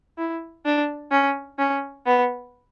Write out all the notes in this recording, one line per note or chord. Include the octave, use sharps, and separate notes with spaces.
E4
D4
C#4
C#4
B3